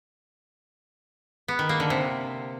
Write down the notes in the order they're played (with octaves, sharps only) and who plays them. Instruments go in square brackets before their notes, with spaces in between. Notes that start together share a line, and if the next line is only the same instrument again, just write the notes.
[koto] B3
D#3
A#3
D3
C3